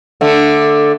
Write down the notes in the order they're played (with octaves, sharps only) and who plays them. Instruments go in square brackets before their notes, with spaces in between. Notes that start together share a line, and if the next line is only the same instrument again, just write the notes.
[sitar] D3 A3